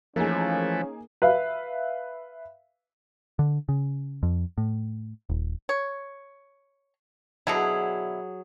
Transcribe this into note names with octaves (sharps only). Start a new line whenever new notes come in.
E3 F3 A3 A#3 C#4 D#4 G#4
B4 E5 F5
D3
C#3
F2
A2
D#1
C#5
B2 D3 F#3 E4 G#4